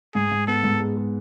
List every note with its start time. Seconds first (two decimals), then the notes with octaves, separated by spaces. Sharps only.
0.15 G#2 G#4
0.31 G#2
0.47 B3 A4
0.64 G#2
0.80 G#3
0.97 G#3